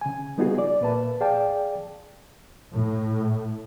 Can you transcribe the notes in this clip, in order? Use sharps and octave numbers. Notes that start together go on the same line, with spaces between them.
C#3 G#5
G3 B3 D#4 F4 F#4 G#4
D5
A#2 A#3 B4 E5 A5
G#4 D5 F5 G5 A5
A2